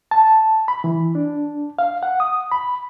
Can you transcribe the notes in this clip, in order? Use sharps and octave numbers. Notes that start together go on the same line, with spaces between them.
A5
B5
E3
D4
F5
F#5
D#6
B5